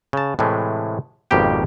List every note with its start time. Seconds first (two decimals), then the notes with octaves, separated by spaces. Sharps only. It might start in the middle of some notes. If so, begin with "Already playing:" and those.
0.13 C#3 A5
0.39 A2 C3 E3 G#3 A3
1.31 G#1 F2 B2 A#3 G4 G5